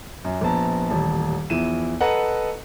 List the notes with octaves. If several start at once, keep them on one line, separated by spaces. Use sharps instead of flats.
F#2
A#1 B3 A5 A#5
D#1 A1 A5
E2 F3 E4 D#7 E7
A4 B4 D#5 F#5 A#5